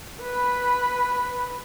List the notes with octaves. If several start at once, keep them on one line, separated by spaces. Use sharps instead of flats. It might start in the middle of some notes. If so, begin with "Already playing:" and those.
B4 B5